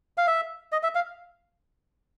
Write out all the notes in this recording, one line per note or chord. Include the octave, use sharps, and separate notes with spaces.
F5
E5
D#5
E5
F5